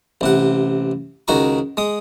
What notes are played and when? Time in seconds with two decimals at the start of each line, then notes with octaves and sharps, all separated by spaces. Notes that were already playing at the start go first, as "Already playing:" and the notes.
0.21 A1 C3 F#5
1.28 C#2 D#3 F#4 A#5 C#6
1.77 G#3 D#6